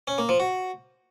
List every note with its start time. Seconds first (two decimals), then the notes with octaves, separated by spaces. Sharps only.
0.08 C#4
0.18 A#3
0.29 F3
0.40 F#4